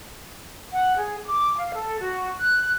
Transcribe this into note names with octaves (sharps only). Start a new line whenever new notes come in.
F#5
G#4
D6
F5
A4
F#4
F#6